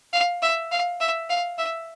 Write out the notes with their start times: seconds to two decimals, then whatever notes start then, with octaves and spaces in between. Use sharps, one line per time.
0.13 F5
0.42 E5
0.72 F5
1.01 E5
1.30 F5
1.58 E5